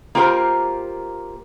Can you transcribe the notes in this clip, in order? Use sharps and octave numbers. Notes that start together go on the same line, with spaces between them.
A#3 F4 G4 A#4 C5